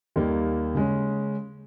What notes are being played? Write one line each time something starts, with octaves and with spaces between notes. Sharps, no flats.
D#2 D#3 G3 A#3
C#3 G#3 C#4